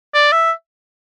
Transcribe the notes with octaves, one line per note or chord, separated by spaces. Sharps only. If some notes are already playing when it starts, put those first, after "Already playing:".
D5
E5